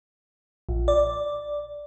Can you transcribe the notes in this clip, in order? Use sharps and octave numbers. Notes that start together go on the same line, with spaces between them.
A#1
D5